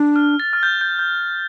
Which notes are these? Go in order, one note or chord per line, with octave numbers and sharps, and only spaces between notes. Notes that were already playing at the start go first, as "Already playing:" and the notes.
Already playing: D4
F6
A6
F6
G6
G6
G6